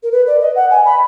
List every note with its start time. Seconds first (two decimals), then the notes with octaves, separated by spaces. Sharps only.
0.03 A#4
0.11 B4
0.26 D5
0.41 D#5
0.55 F#5
0.70 G#5
0.84 B5